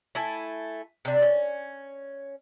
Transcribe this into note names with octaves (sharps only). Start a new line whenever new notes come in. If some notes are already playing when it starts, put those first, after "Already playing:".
A3 E4 G#5 A5
C3 D4
C#4